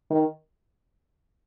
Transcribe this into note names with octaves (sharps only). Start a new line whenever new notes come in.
D#3